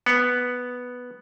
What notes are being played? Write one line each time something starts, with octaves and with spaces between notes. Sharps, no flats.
B3